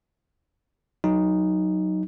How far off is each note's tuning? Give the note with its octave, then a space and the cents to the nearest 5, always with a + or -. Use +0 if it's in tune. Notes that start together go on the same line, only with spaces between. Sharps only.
F#3 +0 D#4 +0